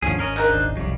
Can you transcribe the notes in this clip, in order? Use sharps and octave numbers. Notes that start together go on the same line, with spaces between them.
D#2 G#2 D3 F3 C#4 G#4
G#1 C#4 A#4 D#5
C#3 D4 D#4 A#4 C5 F#6
D#1 G#1
E1 C2 F2 F#3 G3